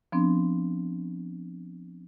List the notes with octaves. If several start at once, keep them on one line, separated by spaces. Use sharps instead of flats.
F3 B3 C4 D4